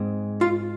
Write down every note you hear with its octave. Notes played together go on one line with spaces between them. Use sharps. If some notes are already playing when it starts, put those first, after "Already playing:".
Already playing: G#2 G#3 C4
F4